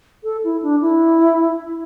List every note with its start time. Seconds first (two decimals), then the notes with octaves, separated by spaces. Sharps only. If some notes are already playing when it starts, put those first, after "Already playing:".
0.24 A4
0.44 E4
0.62 D4
0.81 E4